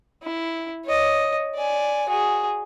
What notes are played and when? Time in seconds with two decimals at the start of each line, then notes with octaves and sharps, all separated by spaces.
0.23 E4
0.85 C#5 D#5
1.55 D5 G#5
2.09 F#4 G#4